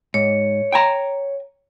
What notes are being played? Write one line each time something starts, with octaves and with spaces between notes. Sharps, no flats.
G#2 C#5
G5 G#5 A#5